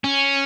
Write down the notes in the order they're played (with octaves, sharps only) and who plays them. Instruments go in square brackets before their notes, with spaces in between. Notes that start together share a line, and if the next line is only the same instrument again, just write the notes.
[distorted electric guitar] C#4